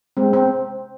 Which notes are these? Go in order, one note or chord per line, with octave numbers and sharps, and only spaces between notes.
G#3 C4
C4